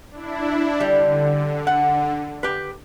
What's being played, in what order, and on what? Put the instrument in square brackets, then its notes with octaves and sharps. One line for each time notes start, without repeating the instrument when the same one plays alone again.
[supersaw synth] D4 E4
[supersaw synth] D3 [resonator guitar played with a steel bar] G3
[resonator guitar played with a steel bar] F#5
G4 B4